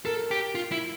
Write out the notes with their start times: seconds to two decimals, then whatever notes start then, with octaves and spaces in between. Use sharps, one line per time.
0.05 A4 A#4
0.31 G4
0.55 F4
0.72 E4